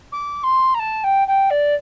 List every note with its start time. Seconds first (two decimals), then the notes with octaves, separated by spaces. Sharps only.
0.12 D6
0.43 C6
0.74 A#5
0.79 A5
1.03 G5
1.27 G5
1.50 D5